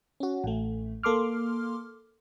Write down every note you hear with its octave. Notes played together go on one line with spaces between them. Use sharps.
C#4 F#4
A1 A3
A#3 A4 C6 D6 F6